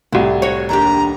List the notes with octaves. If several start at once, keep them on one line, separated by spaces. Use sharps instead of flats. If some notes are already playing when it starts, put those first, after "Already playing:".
C2 A2 E4
F#4 C#5
D#2 D4 G4 A#5